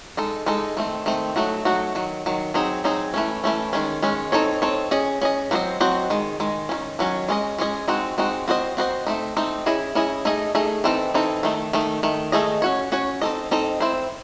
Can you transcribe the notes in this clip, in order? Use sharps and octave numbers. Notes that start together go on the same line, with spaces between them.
G#3 D#4 A4
G#3 D#4 A4
D#3 A3 C4
D#3 A3 C4
F#3 A3 D#4 F#4
F#3 A3 D#4 F#4
D#3 F#3
D#3 F#3
F#3 C4 D#4 G#4
F#3 C4 D#4 G#4
E3 A3 C#4
E3 A3 C#4
D#3 G#3 C#4
D#3 G#3 C#4
C4 D#4 A4 C#5
C4 D#4 A4 C#5
C#4 G#4 D#5
C#4 G#4 D#5
F#3 C4 F#4 C5 D#5
F#3 C4 F#4 C5 D#5
D#3 G#3
D#3 G#3
D#3 F#3 C#4
D#3 F#3 C#4
G#3 C#4 G#4 D#5
G#3 C#4 G#4 D#5
G#3 C4 D#4 F#4
G#3 C4 D#4 F#4
C4 F#4 C5 D#5
C4 F#4 C5 D#5
A3 C4 D#4
A3 C4 D#4
C#4 E4 G#4 D#5
C#4 E4 G#4 D#5
A3 D#4 G#4 D#5
A3 D#4 G#4 D#5
E3 C4 D#4 A4
E3 C4 D#4 A4
D#3 A3 D#4
D#3 A3 D#4
D#3 A3
D#3 A3 D#4 G#4 D#5
C#4 F#4 C#5
C#4 F#4 C#5
C4 D#4 A4 D#5
C4 D#4 A4 D#5
C4 E4 C5